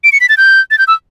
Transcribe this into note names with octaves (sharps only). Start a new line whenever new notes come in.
D7
C#7
B6
A6
G6
A6
G6
E6